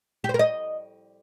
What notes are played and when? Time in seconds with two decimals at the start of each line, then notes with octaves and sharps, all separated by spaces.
0.24 G4
0.29 C5
0.34 A#4
0.39 D#5